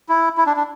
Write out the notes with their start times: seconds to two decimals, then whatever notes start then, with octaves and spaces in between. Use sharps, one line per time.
0.09 E4
0.37 E4
0.46 D4
0.56 D4